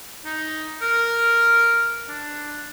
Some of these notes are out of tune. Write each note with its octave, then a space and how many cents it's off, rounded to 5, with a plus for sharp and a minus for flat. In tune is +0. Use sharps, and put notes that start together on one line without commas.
D#4 +5
A#4 -5
D4 +5